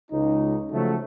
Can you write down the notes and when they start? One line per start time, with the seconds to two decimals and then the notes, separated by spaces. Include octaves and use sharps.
0.11 C#2 D#4
0.73 C#3 F3 F#3 A3